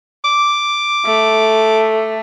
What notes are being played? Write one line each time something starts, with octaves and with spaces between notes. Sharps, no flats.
D6
A3